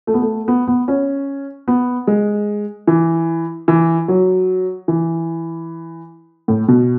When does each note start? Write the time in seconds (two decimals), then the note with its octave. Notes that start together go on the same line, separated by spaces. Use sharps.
0.07 A3
0.14 B3
0.21 A3
0.48 B3
0.68 B3
0.88 C#4
1.68 B3
2.07 G#3
2.87 E3
3.68 E3
4.08 F#3
4.88 E3
6.48 A2
6.68 B2